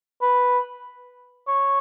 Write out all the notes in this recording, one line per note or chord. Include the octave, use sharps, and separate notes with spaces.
B4
C#5